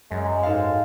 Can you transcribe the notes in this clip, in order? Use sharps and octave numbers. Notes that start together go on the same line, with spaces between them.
F#2 G#3
G#2 A4 F5